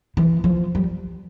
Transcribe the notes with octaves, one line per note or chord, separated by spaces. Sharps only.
E3
F3
G3